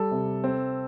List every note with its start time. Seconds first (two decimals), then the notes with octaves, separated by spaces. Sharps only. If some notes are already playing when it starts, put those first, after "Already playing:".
Already playing: G3 A4
0.11 C3
0.44 C4